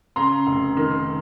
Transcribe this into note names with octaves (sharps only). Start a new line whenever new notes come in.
C#3 A#5 C6
F1
D#3